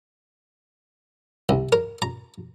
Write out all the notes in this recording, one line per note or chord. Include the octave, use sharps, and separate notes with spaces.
C2
A#4
A#5